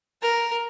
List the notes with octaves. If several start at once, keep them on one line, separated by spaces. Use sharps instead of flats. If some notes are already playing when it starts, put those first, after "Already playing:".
A#4